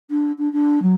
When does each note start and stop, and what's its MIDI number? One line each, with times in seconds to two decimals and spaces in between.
0.10 0.32 62
0.38 0.51 62
0.52 0.82 62
0.82 0.94 54